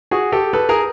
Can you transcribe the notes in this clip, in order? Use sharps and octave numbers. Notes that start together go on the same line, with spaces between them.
F#4 G#4
G4 A4
A4 B4
G#4 A#4